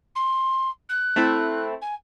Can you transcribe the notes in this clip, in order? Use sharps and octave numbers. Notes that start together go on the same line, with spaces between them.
C6
F#6
A3 C4 E4
G#5